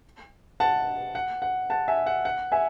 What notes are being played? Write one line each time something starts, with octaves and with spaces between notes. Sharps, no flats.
F#5 A5
F#5
F#5
F#5 A5
E5 G#5
F#5
F#5
E5 G#5